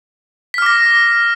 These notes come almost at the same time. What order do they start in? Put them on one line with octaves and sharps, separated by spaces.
B6 F6 D6 A#6